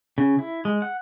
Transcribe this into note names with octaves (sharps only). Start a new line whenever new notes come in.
C#3
E4
G#3
F#5